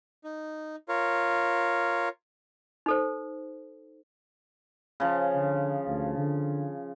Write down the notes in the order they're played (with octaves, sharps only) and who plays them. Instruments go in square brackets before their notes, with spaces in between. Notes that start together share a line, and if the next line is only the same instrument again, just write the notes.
[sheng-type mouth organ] D#4
F4 A#4 C#5
[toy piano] D#4 A4 C5
[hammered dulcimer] C#3 F3
[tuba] D3
D2
D3